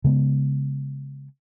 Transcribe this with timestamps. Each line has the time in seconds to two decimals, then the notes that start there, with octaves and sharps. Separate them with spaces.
0.04 C#3 G#3 B3